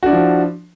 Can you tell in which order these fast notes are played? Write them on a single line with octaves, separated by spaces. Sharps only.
F#4 D4 E4 F3